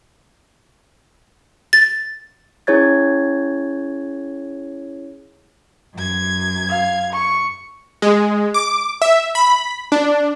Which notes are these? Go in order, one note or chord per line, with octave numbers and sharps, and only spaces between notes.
A6
C#4 E4 G#4 C#5 G#6 A6
F#2 G#6
F5
C#6
G#3
D6
E5
B5
D4